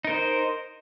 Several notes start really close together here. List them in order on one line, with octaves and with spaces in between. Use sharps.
D#4 A#4 C5